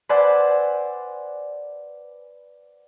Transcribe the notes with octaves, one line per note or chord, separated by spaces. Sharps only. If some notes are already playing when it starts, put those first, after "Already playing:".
B4 C5 D5 F#5 G#5 E6